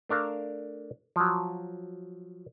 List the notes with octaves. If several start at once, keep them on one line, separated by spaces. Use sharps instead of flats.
A3 D4 A#4 F5 A5
F3 F#3